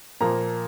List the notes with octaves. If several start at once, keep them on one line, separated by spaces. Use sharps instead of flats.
A#2 F3 A#3 A#5